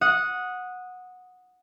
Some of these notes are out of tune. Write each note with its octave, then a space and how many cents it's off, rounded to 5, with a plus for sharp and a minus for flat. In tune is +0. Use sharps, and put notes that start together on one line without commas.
F#5 -15 D#6 +0